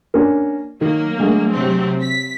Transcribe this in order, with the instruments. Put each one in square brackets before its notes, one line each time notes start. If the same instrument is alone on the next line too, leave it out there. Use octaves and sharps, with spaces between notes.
[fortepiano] A#3 C#4 D4
[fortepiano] D#3 [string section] F#3 A#3
[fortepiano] D3 G#3 A3
[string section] C3 F#3 C4
B6